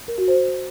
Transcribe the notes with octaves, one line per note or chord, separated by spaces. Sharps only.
A#4
F#4
C5